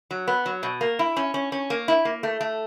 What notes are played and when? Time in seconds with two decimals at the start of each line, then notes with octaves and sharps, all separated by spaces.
0.11 F#3
0.28 B3
0.46 F#3
0.63 B2
0.81 A#3
0.99 E4
1.17 C#4
1.34 C#4
1.52 C#4
1.70 A#3
1.88 E4
2.05 A#3
2.23 A3
2.41 A3